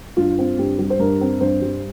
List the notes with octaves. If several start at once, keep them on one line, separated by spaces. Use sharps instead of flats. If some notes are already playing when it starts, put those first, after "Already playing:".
G2 F4
C4
G2 G4
G3
C5
G2 A#4
C4
G2 C5
G3